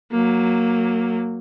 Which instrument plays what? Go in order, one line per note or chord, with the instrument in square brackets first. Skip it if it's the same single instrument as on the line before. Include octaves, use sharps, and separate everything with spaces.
[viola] F#3 A#3